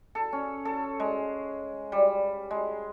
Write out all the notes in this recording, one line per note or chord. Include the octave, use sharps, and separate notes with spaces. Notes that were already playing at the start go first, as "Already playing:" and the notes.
A4
C#4
A4
G#3
G3
G#3